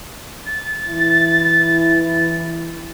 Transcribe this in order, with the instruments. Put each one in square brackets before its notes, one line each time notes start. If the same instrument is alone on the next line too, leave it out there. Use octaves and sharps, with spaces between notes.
[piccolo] A6
[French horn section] E3 E4